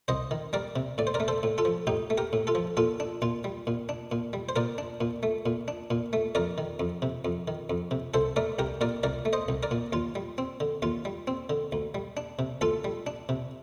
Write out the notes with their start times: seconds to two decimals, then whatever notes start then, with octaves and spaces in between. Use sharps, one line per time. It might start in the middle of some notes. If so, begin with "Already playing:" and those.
0.08 C2 C5 D#5
0.31 D#3
0.53 G3 A#4 D5
0.76 C3
0.98 A2 D5
1.07 C5
1.14 A#4 D5
1.20 A3
1.28 A4 C5
1.43 A2
1.58 F4 A4
1.65 F3
1.87 A2 D#4 G4
2.10 A3
2.18 G4 A#4
2.33 A2
2.47 F4 A4
2.55 F3
2.77 A#2 F4 A4
3.00 D4
3.22 A#2 F4
3.44 G3
3.67 A#2
3.89 D4
4.12 A#2
4.33 G3
4.49 C5
4.56 A#2 A#4 D5
4.78 D4
5.01 A#2
5.23 A3
5.46 A#2
5.68 D4
5.90 A#2
6.13 A3
6.35 F2 A#4 D5
6.58 D#3
6.80 F2
7.02 C3
7.25 F2
7.48 D#3
7.70 F2
7.91 C3
8.14 C2 A4 C5
8.36 A3 A#4 D5
8.59 C2 G4 A#4
8.81 A#2 A#4 D5
9.03 C2 A#4 D5
9.25 A3
9.33 C5 D#5
9.49 C2
9.63 A#4 D5
9.71 A#2
9.93 D#2 F4
10.15 G3
10.38 C4
10.60 D3
10.82 D#2 F4
11.05 G3
11.27 C4
11.50 D3
11.72 D2
11.95 G3
12.17 D4
12.39 C3
12.61 D2 F4 A4
12.84 G3
13.07 D4
13.29 C3